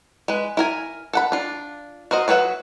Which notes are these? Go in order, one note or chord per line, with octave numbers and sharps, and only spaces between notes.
G#3 B4
E4 A#4 G#5
A4 F#5 B5
D4 F4
F#4 A#4 C5 D#5
F#3 B4 C#5 E5 F#5